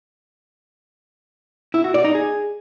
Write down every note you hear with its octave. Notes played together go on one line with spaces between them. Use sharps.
E4
F#4
D5
D#4
G#4